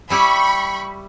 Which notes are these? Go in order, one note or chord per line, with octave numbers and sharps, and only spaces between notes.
G3 E4 G4 B5 C#6